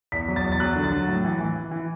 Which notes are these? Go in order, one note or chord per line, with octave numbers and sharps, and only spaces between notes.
E2 B6
F#3
A6
E2
A6
F#3 F#6
D3
A6
F#3
A2
E3
E3
E3
E3